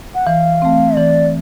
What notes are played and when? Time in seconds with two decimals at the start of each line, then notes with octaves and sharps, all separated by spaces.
0.15 F#5
0.26 E3 F5
0.62 A3 C4
0.97 E3 D5